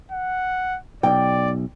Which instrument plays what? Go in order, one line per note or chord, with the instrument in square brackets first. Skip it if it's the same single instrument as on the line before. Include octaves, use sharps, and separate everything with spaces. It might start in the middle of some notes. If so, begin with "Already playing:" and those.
[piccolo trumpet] F#5
[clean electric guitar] B1 [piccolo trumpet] D5 [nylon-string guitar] G5